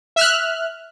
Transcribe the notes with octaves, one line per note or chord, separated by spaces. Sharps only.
E5 F6 F#6